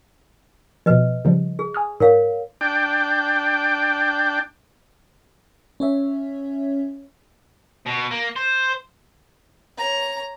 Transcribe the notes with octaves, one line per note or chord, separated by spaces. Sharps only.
B2 F3 B4 D#5
C#3 F3 G3
G#4
G#5 D#6 F6
G#2 A#4 C#5 F5
D4 G5
C#4 C#5 E5
B2
A#3
C5
C#5 A#5